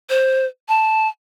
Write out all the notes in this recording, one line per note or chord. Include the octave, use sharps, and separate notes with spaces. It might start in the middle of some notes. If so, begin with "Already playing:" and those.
C5
A5